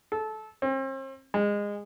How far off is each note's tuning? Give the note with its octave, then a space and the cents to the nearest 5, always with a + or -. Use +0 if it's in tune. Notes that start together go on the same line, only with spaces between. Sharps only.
A4 -20
C4 +40
G#3 -20